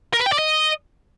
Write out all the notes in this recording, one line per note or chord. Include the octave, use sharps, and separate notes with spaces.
A#4
B4
G5
D5
D#5